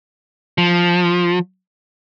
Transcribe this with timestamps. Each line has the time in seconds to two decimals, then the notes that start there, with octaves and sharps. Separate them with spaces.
0.58 F3